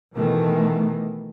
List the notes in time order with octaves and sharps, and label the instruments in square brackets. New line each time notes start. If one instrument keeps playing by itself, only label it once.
[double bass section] B2 D#3 E3 A3